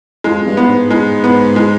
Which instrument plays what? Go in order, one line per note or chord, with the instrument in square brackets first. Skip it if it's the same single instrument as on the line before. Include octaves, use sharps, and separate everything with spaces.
[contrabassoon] F2 [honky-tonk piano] G#3
[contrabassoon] F2
G2
[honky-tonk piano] B3
[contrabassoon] G#2
[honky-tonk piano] G#3
B3
G#3